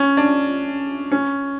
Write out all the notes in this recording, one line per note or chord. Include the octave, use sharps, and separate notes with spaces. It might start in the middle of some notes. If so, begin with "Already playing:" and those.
Already playing: C#4
D4
C#4